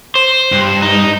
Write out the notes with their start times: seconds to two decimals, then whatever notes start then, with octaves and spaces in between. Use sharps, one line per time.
0.15 C5
0.52 G2
0.83 D#4